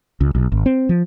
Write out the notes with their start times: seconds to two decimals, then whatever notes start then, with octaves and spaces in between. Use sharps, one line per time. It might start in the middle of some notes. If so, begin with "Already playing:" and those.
0.21 C#2
0.35 B1
0.52 G#1
0.66 C4
0.89 F3